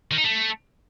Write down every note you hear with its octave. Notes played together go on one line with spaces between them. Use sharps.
D#3
D#4
A3